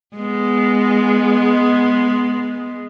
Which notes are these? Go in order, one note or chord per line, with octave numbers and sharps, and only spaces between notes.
G#3 B3